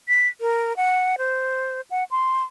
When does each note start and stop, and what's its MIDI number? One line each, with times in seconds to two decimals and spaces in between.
0.08 0.28 95
0.41 0.75 70
0.77 1.16 78
1.18 1.81 72
1.90 2.04 78
2.11 2.43 84